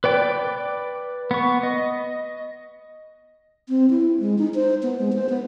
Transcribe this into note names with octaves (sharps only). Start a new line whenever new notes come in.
B4 D5 G5
B3 C#6
D#5
C4
E4
G#3
D#4
C5
B3
G#3
C5
B3